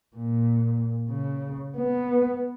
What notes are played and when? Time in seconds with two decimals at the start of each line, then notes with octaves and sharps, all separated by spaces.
0.17 A#2
1.10 C#3
1.78 B3